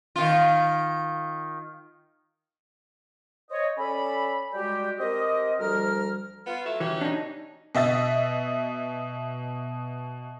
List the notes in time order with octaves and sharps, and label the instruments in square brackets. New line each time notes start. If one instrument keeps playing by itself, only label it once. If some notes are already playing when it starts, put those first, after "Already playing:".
[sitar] D#3 F4
[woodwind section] C5 C#5 D#5
C#4 A4 D5 B5
G3 G#3 F#4 G4
C4 G4 A#4 D#5
D2 F3 G3 A#4 F6
[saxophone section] B3 F4
F#3 A3 E5
[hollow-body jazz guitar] E3 [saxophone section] F#3 C#4 G4
[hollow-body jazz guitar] D4 D#4
[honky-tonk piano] B2 D#5 E5 A6